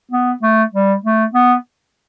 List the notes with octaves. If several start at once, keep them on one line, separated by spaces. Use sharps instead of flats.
B3
A3
G3
A3
B3